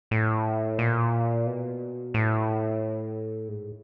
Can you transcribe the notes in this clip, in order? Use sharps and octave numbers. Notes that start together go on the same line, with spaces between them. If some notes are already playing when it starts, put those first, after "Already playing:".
A2
A#2
B2
A2
G#2